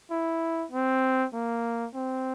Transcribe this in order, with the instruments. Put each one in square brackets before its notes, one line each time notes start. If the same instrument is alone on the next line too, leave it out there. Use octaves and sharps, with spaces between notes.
[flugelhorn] E4
C4
A#3
C4